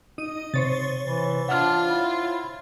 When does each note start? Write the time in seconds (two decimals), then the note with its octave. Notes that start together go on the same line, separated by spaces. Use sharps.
0.18 D#4 D#7
0.54 C3 C5 C#5 A6
1.04 E3
1.49 D4 F4 F#5 F6
1.87 E4